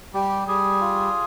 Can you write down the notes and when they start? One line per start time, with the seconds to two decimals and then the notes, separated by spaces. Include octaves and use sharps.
0.14 G3 G4
0.47 G3 G#4
0.81 F4